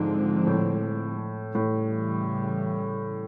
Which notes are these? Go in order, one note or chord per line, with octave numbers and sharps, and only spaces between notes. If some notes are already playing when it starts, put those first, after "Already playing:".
Already playing: G#2 D3 F3 G#3 C4
A2
A2 C#3 E3 G3